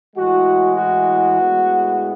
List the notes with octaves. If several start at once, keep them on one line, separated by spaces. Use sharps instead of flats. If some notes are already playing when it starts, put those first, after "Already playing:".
A2 E3 G#3 F#4
F#4
A2 G#3 B3